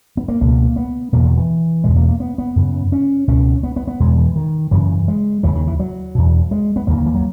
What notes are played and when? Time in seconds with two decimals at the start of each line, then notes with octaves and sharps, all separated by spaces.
0.17 B3
0.28 A#3
0.41 C#2 B2 A#3
0.76 B3
1.13 E2 B2 A#3
1.25 D#3
1.37 E3
1.84 E2 B2 G#3
1.96 A#3
2.08 A#3
2.20 B3
2.38 B3
2.56 F#2 C#3
2.92 C#4
3.28 C#2 B2 C#4
3.63 B3
3.76 B3
3.88 B3
4.00 E2 B2 G#3
4.18 E3
4.36 D#3
4.71 F#2 C#3 E3
5.08 G#3
5.43 D#2 C#3 E3
5.56 D#3
5.67 E3
5.80 F#3
6.15 E2 B2
6.51 G#3
6.76 B3
6.87 D#2 C#3 A#3
6.97 D#3
7.06 E3
7.15 F#3